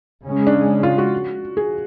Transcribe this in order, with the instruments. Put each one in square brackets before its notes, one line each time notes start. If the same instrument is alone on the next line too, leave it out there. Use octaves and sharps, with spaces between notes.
[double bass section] C#3 G#3 C#4
[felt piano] D4
F4
F#4
G#4